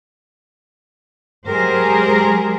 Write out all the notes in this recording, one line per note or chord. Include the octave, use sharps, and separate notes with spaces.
F#3 G#3 G4 G#4 A#4 C5